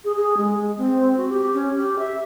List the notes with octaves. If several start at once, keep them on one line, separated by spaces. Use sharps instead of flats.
G#4
G#4
G#3
C4
F#4
G4
C#4
G4
E5